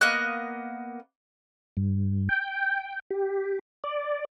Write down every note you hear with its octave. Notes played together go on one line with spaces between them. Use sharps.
A#3 B3 D#5 F#6
G2
G5
G4
D5